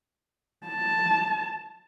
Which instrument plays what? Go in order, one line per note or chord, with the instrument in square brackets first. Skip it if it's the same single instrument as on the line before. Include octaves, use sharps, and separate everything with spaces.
[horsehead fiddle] A5